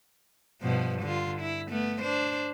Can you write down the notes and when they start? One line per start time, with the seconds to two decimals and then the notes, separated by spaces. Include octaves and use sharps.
0.62 G2 B2 F3
1.02 D3 F4
1.41 E4
1.69 A3 B3
2.02 D4 C5